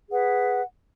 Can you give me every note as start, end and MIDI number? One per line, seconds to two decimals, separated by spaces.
0.10 0.62 68
0.10 0.62 71
0.10 0.62 78